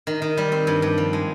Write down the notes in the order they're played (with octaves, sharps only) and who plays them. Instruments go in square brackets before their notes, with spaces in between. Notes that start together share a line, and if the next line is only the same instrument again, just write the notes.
[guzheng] D#3
D#3
G3
C4
G2
G2
F3
G#3